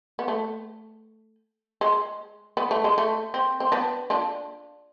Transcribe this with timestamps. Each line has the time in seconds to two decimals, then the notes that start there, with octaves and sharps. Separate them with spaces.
0.19 B3
0.28 A3
1.81 G#3
2.57 B3
2.71 A3
2.84 G#3
2.98 A3
3.34 C4
3.60 C4
3.72 B3 D4
4.10 D4 F4